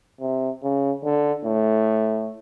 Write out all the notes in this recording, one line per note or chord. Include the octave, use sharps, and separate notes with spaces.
C3
C#3
D3
A2